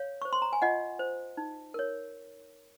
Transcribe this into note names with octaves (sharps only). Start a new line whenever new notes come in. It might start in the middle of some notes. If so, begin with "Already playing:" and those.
Already playing: C#5 F5
C5 C#6
C6
A#5
G#5
F4 D#5 F#5
C5
D#4
A#4 C#5